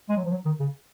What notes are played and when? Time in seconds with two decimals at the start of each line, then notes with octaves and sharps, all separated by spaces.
0.09 G#3
0.17 F#3
0.25 F3
0.31 F#3
0.45 D#3
0.60 C#3